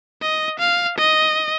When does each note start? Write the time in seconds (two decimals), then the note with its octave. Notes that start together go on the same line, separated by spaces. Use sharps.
0.22 D#5
0.60 F5
0.98 D#5